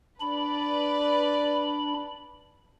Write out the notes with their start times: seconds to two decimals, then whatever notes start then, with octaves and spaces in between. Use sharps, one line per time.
0.20 D4 B4 D5 B5